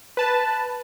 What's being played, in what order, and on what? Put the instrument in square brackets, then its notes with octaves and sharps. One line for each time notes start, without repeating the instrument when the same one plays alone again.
[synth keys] B4 A5